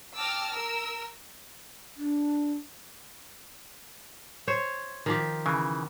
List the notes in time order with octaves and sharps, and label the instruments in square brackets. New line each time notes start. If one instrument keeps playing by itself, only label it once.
[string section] G5 A5 D6 E6 F6 A#6
A#4 E6
[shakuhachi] D4
[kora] C5 C#5
D#3 F3 G4
[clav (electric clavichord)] C#3 E3